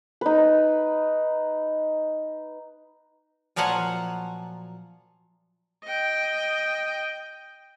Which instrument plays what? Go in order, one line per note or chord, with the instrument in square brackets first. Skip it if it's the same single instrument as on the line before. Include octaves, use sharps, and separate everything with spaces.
[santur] D#4 B4
[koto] A#2 F3 F#3 F5 F#5 G#5
[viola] D#5 G5